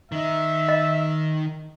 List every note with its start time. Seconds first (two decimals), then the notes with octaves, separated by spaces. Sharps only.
0.12 D#3 D#4 E5
0.69 D#5